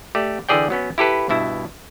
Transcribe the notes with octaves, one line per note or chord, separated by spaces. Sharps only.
A3 G4 D5
D3 E3 G#4 D5 G5
F#3 B3 C#4
E4 G4 A4 B4
G2 B2 E4 E5